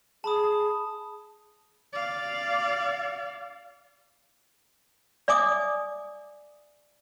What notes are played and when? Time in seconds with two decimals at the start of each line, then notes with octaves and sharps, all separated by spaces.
0.24 G#4 A5 B5 D#6
1.93 D5 F5
5.28 D5 E5 G#5 D6 D#6